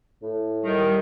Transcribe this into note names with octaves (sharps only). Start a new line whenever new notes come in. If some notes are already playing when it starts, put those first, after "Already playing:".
A2
D#3 G3